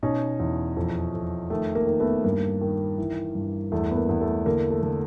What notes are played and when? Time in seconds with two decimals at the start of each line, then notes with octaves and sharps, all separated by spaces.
0.03 B2 C#4 D#4
0.40 E2
0.77 F2
1.14 F2
1.50 D#3 A3
1.75 A#3
1.87 D#3
2.00 A3 B3
2.24 G2 A#3
2.61 D#3
2.98 E3
3.35 G2
3.72 E2 A3
3.91 B3
3.96 A#3
4.09 E2
4.21 A3
4.46 D3 A#3
4.70 A3
4.83 D3